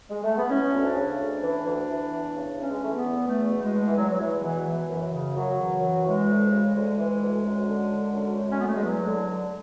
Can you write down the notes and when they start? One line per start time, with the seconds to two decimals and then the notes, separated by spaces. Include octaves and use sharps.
0.10 G#3
0.24 A3
0.38 B3
0.50 E3 C#4
0.73 D2
0.81 E4
0.85 D4
0.96 C#3
1.20 D2
1.42 E3
1.66 D2
1.89 E3
2.12 E2
2.36 C#3
2.58 E2 C#4
2.71 G#3
2.82 E3 A3
2.93 B3
3.05 E2
3.28 E2 A3
3.51 B2
3.62 G#3
3.74 B2
3.87 E3
3.97 E2 F#3
4.10 F#3
4.20 E2 E3
4.43 B2 E3
4.67 E3
4.90 F#2
5.13 C#3
5.37 F#2 F#3
5.60 E3
5.82 F#2
6.06 E3 G#3
6.28 D2
6.52 C#3
6.75 D2 G#3
6.99 E3
7.22 D2
7.45 F#2
7.68 D3
7.91 D3
8.14 F#2
8.38 F#2
8.52 C#4
8.60 D3 B3
8.67 A3
8.76 G#3
8.83 E2 F#3
9.07 D3
9.30 D3